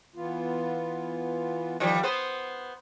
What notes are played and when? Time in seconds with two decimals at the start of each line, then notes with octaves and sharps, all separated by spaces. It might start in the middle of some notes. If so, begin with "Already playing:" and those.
0.15 E3 B3 F4
1.80 D#3 F3 G3
2.03 B3 B4 C5